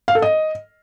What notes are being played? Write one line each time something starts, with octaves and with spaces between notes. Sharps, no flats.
F5
A4
D#5